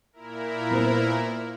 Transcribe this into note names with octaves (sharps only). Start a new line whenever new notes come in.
A#2 E4 A#4
B3 B4 C5